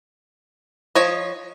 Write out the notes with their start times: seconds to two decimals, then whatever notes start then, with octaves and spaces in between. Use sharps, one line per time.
0.95 F3 C#5 D#5